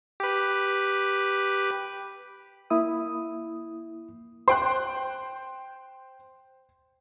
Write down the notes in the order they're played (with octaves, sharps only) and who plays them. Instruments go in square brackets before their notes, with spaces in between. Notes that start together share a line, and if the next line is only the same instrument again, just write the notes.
[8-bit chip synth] G4 B4
[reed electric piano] A#3 E4 D#6
[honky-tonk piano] C5 G5 F#6 [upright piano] C6